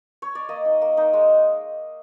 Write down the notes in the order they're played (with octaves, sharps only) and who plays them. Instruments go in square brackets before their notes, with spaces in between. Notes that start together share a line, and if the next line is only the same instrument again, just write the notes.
[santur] C#5
D5
A#3 D#5
D#4
A#3
D#4
G#3